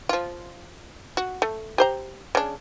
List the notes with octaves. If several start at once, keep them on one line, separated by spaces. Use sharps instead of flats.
F3 F4
F#4
A3
G4 C5 A#5
C#3 D4